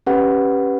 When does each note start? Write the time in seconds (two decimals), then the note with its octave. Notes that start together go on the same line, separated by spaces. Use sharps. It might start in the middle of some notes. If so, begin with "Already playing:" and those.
0.07 C#4 G4 B4 F#5